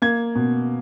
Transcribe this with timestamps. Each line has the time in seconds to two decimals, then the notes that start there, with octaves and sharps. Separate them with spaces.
0.02 A#3 G#6
0.35 B2